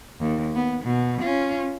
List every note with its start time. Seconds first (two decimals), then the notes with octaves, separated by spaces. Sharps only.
0.20 D#2
0.55 B3
0.84 B2
1.21 C#4 F4